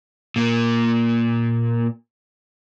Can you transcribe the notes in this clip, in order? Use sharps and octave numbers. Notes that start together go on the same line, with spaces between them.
A#2 A#3